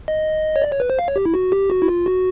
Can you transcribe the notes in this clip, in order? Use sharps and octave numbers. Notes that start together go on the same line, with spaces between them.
D#5
C#5
D5
C#5
B4
C5
F5
C#5
G4
E4
F#4
G4
F#4
E4
F4
F#4